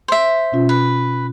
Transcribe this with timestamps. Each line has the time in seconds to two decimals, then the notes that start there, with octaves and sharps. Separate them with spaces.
0.08 C5 E5
0.52 B2 C#4 F4
0.69 B4